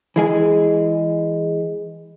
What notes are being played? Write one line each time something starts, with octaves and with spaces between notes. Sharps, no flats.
E3 G#3 G#4